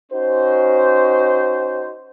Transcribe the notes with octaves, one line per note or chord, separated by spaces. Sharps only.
C#4 D#4 F#4 C5